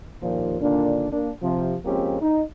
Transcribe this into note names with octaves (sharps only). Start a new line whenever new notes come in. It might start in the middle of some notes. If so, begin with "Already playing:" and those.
D#2 A#2 F3
A#2 D3 D#3 D4
A#3 D4
C3 F3
F3 G#3 A#3 C4 C#4 G4
D#4